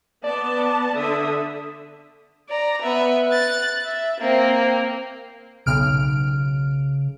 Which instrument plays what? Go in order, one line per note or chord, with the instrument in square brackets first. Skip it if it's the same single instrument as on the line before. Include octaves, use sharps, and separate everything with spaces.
[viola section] B3 A5 [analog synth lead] D5
[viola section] D3 E5 [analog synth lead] D#6
[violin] D5 A#5
B3 E5
F#6 A6
E5
A#3 C4
[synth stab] B1 F6 D7 [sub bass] C#3